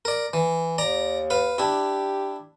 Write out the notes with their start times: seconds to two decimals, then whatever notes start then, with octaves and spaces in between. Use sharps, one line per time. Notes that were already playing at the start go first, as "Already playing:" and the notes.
0.05 A#4 D5
0.33 E3
0.78 D#2 D5 A#5
1.30 B4 F5
1.58 D4 E4 G4